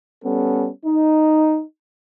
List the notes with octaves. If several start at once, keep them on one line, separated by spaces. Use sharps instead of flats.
G3 B3 C#4 A4
D#4